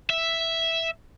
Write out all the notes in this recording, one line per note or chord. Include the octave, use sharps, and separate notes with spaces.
E5